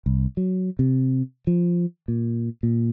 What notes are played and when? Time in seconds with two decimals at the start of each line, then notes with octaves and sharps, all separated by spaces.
0.06 C2
0.37 F#3
0.79 C3
1.47 F3
2.08 A#2
2.63 A#2